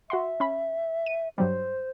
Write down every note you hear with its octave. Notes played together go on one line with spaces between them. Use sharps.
F#4 E5 F#5 C6
C#4 B5
D#7
G2 F#3 G3 C5